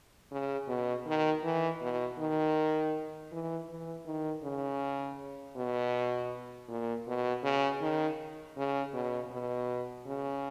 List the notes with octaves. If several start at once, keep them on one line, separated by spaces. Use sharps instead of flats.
C#3
B2
D#3
E3
B2
D#3
E3
E3
D#3
C#3
B2
A#2
B2
C#3
D#3
C#3
B2
B2
C#3